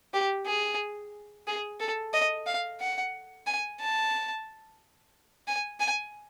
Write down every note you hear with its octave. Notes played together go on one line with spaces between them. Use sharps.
G4
G#4
G#4
A4
D#5
F5
F#5
G#5
A5
G#5
G#5